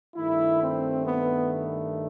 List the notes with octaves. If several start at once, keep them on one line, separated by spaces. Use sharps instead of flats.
G2 D#3 A3 E4
C4
B3